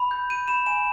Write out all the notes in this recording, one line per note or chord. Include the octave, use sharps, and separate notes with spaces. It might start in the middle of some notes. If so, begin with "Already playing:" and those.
Already playing: B5
G6
G6 D#7
B5 E7
G#5 E7